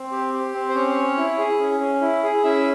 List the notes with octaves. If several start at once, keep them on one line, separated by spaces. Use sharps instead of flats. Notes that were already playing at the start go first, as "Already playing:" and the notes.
Already playing: C4
G4
G4
C4
C5
C#4 C#5
C#4
E4
G#4
C#4
C#4
E4
G#4
C#4 E4 E5